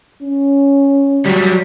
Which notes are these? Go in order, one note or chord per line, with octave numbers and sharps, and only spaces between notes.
C#4
F#3 G3